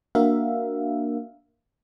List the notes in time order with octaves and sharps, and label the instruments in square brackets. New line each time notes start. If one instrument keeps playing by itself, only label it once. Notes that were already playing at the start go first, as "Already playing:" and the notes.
[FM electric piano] A#3 D4 F#4 A#4 E5 F5